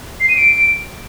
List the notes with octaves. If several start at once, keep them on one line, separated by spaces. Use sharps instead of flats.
C7
D#7
D7